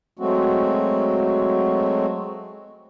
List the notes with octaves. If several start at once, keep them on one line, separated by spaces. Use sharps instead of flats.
F#3 G#3 A3 C4 F#4